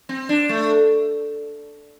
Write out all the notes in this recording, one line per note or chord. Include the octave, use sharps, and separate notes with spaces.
C4
D4
A3